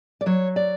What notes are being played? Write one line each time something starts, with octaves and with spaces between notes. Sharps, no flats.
D5
F#3 C#5
D5